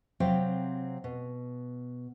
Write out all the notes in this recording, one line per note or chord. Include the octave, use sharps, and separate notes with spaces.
C3 F#3 C4 F5 G5
B2